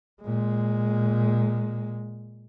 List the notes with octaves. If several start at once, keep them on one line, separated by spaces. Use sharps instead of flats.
A#2 G#3